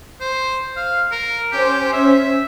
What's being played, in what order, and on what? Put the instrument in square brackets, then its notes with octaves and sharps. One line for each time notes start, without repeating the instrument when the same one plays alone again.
[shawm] C5
F5
A#4
[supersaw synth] C#4 C5 [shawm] G4
[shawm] E5